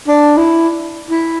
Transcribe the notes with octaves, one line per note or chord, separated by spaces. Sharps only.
D4
E4
E4